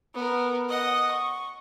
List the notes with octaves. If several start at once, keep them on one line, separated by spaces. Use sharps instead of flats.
B3 A#4
D#5 F#5
C#6